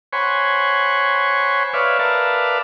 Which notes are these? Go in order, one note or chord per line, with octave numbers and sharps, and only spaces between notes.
C5 C#5 F#5 G#5 B5 C#6
B4 C#5 D5 E5 F5
A#4 B4 D5 E5 F5 A5